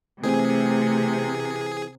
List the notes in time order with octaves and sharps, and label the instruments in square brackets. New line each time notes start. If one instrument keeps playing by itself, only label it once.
[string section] C3 [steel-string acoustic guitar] E3 C4 [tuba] A3 [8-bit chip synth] G#4